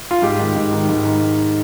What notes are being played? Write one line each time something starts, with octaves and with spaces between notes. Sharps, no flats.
F4
G#2 G4
D#3
G#2
D#3
G#2
D#3